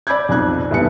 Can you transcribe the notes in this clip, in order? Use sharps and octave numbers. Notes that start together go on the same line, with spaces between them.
D5 B5 D6 E6 G6 G#6
B1 F2 F#6 G#6
F1 E2 G2 B4 C#7